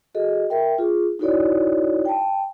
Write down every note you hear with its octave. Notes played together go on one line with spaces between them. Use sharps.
F#4 G#4 A4 D#5
A#4 E5 G5
F4 G#4
D#4 E4 F#4 A4 C#5 D5
G5 A5